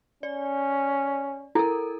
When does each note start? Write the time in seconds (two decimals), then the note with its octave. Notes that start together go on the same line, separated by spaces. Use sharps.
0.23 C#4 D5
1.55 E4 A4 A#4